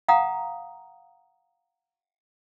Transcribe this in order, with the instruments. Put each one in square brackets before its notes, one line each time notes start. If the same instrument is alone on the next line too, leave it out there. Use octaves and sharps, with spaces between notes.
[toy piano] F5 F#5 A#5 D#6